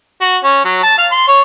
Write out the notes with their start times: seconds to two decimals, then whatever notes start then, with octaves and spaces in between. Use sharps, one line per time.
0.21 F#4
0.44 C#4
0.65 F#3
0.83 A5
0.98 F5
1.12 C6
1.28 C#5